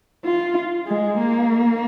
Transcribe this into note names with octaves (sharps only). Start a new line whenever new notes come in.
F4
G#3
A#3